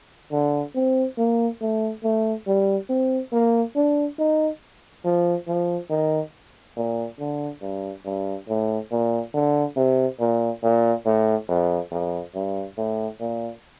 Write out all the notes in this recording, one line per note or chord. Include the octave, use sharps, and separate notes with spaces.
D3
C4
A#3
A3
A3
G3
C4
A#3
D4
D#4
F3
F3
D#3
A#2
D3
G2
G2
A2
A#2
D3
C3
A#2
A#2
A2
F2
F2
G2
A2
A#2